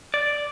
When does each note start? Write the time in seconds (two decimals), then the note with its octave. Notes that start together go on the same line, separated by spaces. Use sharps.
0.14 D5